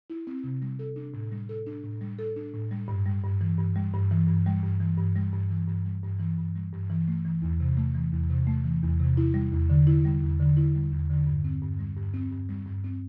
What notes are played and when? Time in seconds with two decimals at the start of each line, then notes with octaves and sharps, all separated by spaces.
0.10 E4
0.27 C4
0.44 C3
0.62 G3
0.79 A4
0.96 D4
1.14 A2
1.31 G3
1.49 A4
1.66 D4
1.84 A2
2.01 G3
2.19 A4
2.36 D4
2.54 A2
2.71 G3
2.88 G2
3.06 G3
3.24 G2
3.41 E3
3.58 G2
3.76 G3
3.94 G2
4.11 E3
4.28 G2
4.46 G3
4.63 G2
4.80 E3
4.98 G2
5.16 G3
5.33 G2
5.50 E3
5.68 G2
5.85 G3
6.03 G2
6.20 E3
6.38 G2
6.55 G3
6.73 G2
6.90 E3
7.08 A3
7.25 E3
7.42 E2
7.60 C3
7.77 A3
7.95 E3
8.12 E2
8.30 C3
8.47 A3
8.65 E3
8.82 E2
9.00 C3
9.17 E4
9.34 G3
9.52 E2
9.70 D3
9.87 E4
10.05 G3
10.22 E2
10.40 D3
10.57 E4
10.75 G3
10.92 E2
11.10 D3
11.27 G2
11.44 C4
11.62 G2
11.79 G3
11.97 G2
12.14 C4
12.32 G2
12.49 G3
12.66 G2
12.84 C4